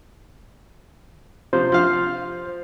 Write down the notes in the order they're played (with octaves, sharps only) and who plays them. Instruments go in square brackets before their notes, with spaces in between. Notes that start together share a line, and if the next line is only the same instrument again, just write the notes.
[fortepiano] C3 F3 [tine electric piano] C5
[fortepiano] F3 F5